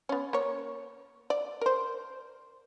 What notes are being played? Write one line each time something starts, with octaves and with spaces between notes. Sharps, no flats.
B3 C#4
A#3 C#5
D5
A#4 C5